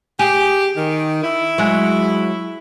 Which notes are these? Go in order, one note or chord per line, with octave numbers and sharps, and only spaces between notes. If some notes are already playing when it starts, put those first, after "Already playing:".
G4 G#4
D#3
E4
F#3 G#3